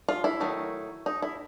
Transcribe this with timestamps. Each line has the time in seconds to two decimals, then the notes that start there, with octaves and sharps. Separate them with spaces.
0.09 F4
0.24 E4
0.40 D#3 F#3 A3
1.06 D#4
1.22 E4